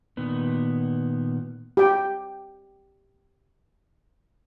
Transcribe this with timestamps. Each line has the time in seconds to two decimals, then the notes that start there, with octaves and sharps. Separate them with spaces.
0.17 A#2 D#3 B3
1.77 G4 G5